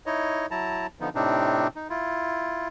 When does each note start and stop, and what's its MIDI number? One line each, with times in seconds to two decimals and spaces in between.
0.06 0.46 63
0.06 0.46 64
0.06 0.46 73
0.06 0.46 75
0.51 0.87 54
0.51 0.87 64
0.51 0.87 81
0.51 0.87 82
1.00 1.09 50
1.00 1.09 53
1.00 1.09 59
1.00 1.09 63
1.15 1.67 45
1.15 1.67 48
1.15 1.67 60
1.15 1.67 62
1.15 1.67 63
1.76 1.88 63
1.90 2.68 64
1.90 2.68 65